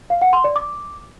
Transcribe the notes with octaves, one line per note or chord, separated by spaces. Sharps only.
F5
F#5
C6
D5
D6